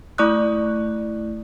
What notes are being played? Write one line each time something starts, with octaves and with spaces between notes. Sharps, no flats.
A3 E4 D5 C#6 D#6 F#6